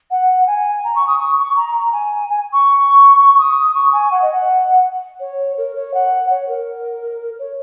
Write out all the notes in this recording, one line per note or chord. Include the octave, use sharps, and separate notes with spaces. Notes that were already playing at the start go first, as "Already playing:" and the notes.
F#5
G#5
A#5
C#6
D#6
C#6
C#6
A#5
A#5
G#5
G#5
C#6
D#6
C#6
G#5
F#5
D#5
F#5
C#5
A#4
C#5
F#5
C#5
A#4
C#5